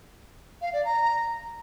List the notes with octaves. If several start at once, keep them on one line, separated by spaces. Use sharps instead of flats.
F5
D5
A#5